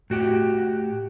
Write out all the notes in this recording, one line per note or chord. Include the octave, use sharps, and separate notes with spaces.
A2 F#4 G4